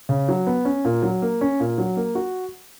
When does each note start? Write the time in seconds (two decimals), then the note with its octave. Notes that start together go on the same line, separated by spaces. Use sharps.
0.09 C#3
0.29 F#3
0.47 B3
0.65 C#4
0.85 A#2
1.03 F#3
1.22 A#3
1.41 C#4
1.60 A#2
1.78 F#3
1.97 A#3
2.15 F#4